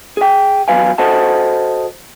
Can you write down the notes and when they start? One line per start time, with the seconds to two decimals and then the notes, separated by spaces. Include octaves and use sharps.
0.17 G#4 G5
0.68 E2 F#3 B4 F5 G#5
0.98 F#4 A4 C5 D#5 F#5 A5